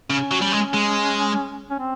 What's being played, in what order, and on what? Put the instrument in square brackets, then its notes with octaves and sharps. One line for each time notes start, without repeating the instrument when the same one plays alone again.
[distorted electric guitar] C#3 [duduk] C#4
[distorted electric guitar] F#3
G3
G#3
G#3
[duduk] C#4
C4